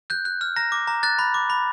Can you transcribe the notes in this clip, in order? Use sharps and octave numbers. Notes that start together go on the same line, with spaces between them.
F#6 G6
F#6
F6
A#5 A#6
D6
A#5
F#6 A6
B5
D6
B5